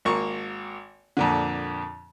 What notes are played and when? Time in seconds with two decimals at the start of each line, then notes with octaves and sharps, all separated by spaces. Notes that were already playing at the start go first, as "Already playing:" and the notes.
0.05 G#1 A#3 C#6
1.17 F2 A#2 D3